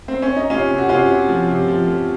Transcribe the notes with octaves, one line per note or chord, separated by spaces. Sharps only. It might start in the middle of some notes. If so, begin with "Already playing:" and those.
C4
C#4
D#4
C3 C#4 F4
C3
F#4
C3 C#4 F4
C3
F3
C3
F3
F3